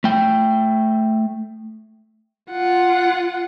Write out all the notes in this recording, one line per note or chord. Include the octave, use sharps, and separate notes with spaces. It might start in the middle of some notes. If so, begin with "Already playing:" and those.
A3 G5
F4 F#5